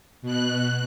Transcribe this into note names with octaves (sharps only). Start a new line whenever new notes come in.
B2 F#6